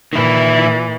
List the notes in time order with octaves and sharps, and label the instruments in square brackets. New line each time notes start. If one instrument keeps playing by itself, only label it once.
[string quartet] A#2 E3 [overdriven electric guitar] D#3 E4